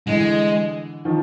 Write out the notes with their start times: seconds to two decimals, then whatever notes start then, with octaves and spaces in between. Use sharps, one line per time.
0.06 D3 E3 G#3
1.05 D#3 F3